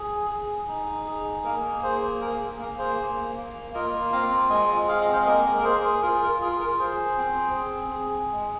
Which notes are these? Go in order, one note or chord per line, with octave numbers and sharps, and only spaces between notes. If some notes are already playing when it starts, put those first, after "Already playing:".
Already playing: G#4
G#4
D#4
G#4
A#3 A#4
G#4 C5
G#4 A#4
G#4
A#3 A#4
G#4 C5
A#3
A#3
F4 A#4 D#5
C4 F5 A#5
G#3 D#5 G#5
G#4 F5
D#5
C5 F5
A#3 A#4 D#5
A#4
G#4 C5
F4 A#4
A#4
F4 G#4
A#4
G#4 C5
C4
G#4
G#4
G#3